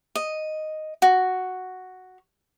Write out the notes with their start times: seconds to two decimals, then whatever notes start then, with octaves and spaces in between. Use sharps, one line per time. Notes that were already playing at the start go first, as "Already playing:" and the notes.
0.15 D#5
1.02 F#4